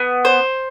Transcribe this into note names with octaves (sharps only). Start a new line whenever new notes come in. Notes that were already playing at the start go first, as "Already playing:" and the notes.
Already playing: B3
C5